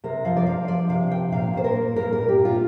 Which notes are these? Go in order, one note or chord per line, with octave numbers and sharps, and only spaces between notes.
C3 A#4
F3 F5
D5
F3 F5
F3 D5
C3 F5
F3 G5
A#2 F5
A#2 C5
A#4
A#3
A#2 A#4
A#4
A#2
G4
A#2
F4